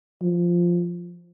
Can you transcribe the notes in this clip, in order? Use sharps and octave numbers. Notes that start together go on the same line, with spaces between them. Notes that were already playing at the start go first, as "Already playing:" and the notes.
F3